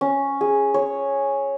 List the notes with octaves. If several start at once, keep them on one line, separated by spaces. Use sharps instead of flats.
C#4
G#4
C#5